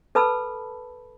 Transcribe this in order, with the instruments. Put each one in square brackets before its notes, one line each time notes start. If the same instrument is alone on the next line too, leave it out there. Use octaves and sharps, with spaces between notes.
[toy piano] A4 B4 A5 B5 E6